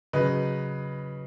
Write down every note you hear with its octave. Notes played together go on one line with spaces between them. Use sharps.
C#3 F#3 B4 D#5